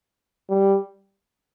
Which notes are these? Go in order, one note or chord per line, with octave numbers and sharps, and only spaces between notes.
G3